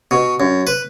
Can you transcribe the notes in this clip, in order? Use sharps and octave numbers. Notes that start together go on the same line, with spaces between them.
B2
F#2
B4